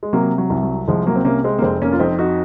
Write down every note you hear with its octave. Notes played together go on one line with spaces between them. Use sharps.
G#3
C3 F#3 A#3
F#3
C2
F#3
C2 F3 G#3
F#3 A#3
C4
C3 A#3 C#4
G#3 C4
A#3
F1 G#3 C4
A#3 C#4
F4
F2 C4 D#4
D#4 F#4